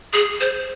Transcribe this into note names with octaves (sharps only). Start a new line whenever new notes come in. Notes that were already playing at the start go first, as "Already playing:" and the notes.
G#4
C5